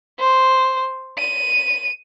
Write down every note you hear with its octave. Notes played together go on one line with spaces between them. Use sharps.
C5
D#7